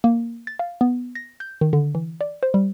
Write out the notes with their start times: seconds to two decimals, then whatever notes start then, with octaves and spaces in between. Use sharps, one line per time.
0.04 A#3
0.47 A6
0.59 F5
0.81 B3
1.15 A#6
1.40 G6
1.61 D#3
1.73 D3
1.95 E3
2.21 D5
2.43 C5
2.54 G3